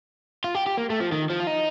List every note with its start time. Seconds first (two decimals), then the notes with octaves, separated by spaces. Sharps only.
0.44 F4
0.55 G4
0.66 G4
0.77 A#3
0.90 A3
1.00 F3
1.12 D#3
1.30 F3
1.40 F4
1.47 D#4